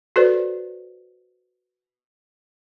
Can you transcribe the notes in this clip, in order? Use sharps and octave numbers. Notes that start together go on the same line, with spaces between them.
F#4 A4 B4 C5 D5